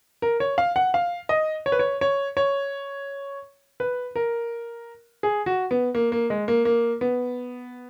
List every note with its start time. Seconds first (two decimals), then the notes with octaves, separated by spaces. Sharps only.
0.22 A#4
0.40 C#5
0.58 F5
0.76 F#5
0.94 F5
1.29 D#5
1.66 C#5
1.72 B4
1.79 C#5
2.01 C#5
2.37 C#5
3.80 B4
4.16 A#4
5.23 G#4
5.46 F#4
5.71 B3
5.95 A#3
6.12 A#3
6.30 G#3
6.48 A#3
6.65 A#3
7.01 B3